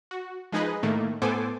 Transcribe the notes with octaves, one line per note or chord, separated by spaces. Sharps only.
F#4
F3 G#3 D#4 G#4 B4 D#5
A2 D#3 A3 A#3
A2 B3 A4 C5 G#5 D6